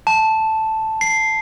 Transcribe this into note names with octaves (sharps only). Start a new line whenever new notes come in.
A5
C7